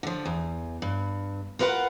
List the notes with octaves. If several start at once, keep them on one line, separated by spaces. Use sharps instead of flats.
D3 F3
E2
G2
F4 A#4 B4 D5 F#5